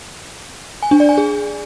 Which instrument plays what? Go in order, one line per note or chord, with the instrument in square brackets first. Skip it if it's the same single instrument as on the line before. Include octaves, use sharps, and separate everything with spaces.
[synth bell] G#5
D4
D5
G#5
G#4